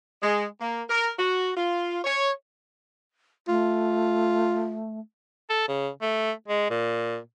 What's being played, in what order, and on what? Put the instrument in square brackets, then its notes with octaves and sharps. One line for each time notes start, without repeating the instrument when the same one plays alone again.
[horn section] G#3
A#3
A#4
F#4
F4
C#5
[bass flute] A3 [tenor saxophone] F4
[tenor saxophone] A4
C#3
A3
G#3
A#2